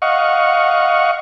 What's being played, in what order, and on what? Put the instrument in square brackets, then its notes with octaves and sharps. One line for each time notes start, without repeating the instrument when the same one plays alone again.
[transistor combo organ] D#5 F5 F#5 C#6